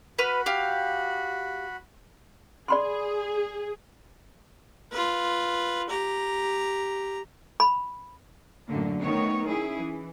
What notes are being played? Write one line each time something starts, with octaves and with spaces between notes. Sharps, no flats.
F#4 B4 B5 F6
G4 F5
G#4 D5 B5 C6
F4 B4
G4 A#5
B5
F#2 A2 D3 A#3
D#3 A3 B3 C#5
C#4 E4 G#4
E3